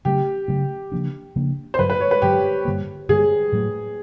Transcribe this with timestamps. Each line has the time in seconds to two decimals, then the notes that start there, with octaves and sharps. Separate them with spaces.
0.05 C#3 F#3 A3 C#4 G4
0.48 C#3 F#3 A3 C#4
0.92 C#3 F3 A#3 D4
1.36 C#3 F3 A#3 D4
1.74 C5
1.79 G2 D3 F#3 B4
1.90 B4
2.01 C#5
2.11 B4
2.22 G2 D3 F#3 G4
2.65 G2 D3 G3 A#3
3.09 G2 D3 G3 A#3 G#4
3.52 A2 F#3 A3